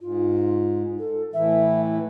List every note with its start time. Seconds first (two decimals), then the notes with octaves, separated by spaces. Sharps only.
0.01 G#2 F4
0.99 A4
1.34 A2 E3 E5